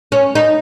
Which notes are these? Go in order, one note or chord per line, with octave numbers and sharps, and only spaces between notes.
C#4
D#4